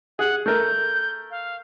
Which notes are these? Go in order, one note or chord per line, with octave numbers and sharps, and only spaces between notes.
G#4 F#5
A3 A#4 G6
F5